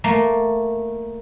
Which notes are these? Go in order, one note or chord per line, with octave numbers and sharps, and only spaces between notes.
A3 A#3